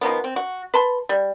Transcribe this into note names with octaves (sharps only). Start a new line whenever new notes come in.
B2 D#3 F3 B3
C4
F#4
B4 A5 C6
G3